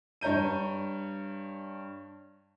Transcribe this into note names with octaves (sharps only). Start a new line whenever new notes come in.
G2 C#5 A#5 G6 D#7